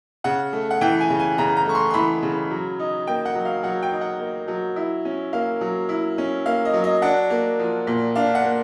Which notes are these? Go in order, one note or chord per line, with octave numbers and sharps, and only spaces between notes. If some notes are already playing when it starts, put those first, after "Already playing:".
C#3 F#5
A3
F#5
E3 G5
G#5
C#3
G#5
C#3 A#5
A#5
A3 C#6
C6
C6
E3 B5
C#3
F#3
D#4
A#3 G5
F#5
F#3
F5
F#3 F#5
G5
D#4
F#5
A#3
F#3
E4
C#4
A#3 F5
F#3
E4
C#4
A#3 F5
D#5
F#3
D#5
D4 F#5
A#3
F3
A#2
D4 F5
F#5
A#3